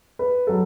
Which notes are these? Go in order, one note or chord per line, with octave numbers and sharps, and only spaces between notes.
B4
F#3 A4